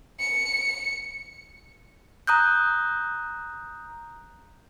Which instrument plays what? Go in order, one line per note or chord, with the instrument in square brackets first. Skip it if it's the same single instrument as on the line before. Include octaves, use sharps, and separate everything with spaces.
[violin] C#7
[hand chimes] A#5 D#6 F#6 G6